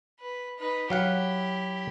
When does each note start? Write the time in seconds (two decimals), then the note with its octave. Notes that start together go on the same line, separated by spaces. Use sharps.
0.20 B4
0.58 D#4 B4
0.90 F#3 E4 G4 F5 F#5